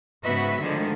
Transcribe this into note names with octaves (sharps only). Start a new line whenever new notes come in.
G#2 C#3 B3 F#4 B4 E5
D3 D#3 F3 G#3 A3